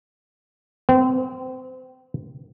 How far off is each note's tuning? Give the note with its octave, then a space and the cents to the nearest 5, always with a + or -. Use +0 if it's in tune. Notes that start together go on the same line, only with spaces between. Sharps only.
C4 -30